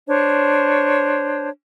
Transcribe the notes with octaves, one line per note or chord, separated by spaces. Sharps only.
D4 C5 C#5